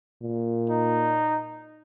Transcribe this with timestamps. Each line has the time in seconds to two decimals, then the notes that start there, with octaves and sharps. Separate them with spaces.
0.22 A#2
0.69 D#4